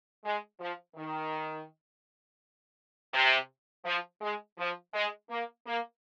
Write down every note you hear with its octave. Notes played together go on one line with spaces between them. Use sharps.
G#3
F3
D#3
C3
F3
G#3
F3
G#3
A#3
A#3